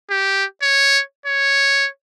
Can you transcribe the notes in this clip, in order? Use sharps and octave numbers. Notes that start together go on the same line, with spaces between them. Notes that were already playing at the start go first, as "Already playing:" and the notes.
G4
C#5
C#5